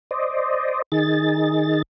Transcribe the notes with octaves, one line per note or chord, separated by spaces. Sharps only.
C5 D5 D#5
D#3 D#4 G#4 A6